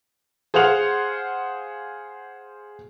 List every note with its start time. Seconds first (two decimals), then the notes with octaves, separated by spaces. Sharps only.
0.54 G#4 C5 F5 F#5 F7